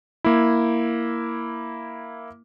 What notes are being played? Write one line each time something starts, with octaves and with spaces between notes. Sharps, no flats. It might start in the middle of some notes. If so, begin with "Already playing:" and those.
A#3 E4